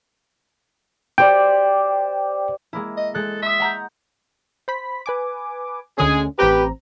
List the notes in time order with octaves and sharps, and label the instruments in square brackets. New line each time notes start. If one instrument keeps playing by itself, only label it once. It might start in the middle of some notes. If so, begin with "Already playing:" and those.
[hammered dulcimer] G4 C5 D5 [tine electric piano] G5
[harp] G#3 A#3 E4
[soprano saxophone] D#5
[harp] G#3 F#6 [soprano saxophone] A4
[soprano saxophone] E5 [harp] C6 D#6
[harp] F#5 A#5 G6
[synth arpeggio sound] C5 B5 B6
B4 G#5 D6
[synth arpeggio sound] D2 D3 C#4 [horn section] G#3 G#4
[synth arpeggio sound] A1 C4 A#5 [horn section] G4 B4